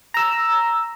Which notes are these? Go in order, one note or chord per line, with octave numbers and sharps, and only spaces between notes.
A#5 E6